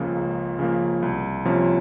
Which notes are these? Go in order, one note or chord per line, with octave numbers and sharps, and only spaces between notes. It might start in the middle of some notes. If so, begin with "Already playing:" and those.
Already playing: C#2 C#3 F3 A#3
C#2
C#3 F3 A#3
C2
C3 F3 A#3 C#4